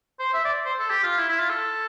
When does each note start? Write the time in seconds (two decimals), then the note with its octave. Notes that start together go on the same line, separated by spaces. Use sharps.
0.19 C5
0.34 E5
0.45 D5
0.65 C5
0.79 A4
0.90 G4
1.03 F4
1.18 E4
1.29 E4
1.39 F4
1.50 A4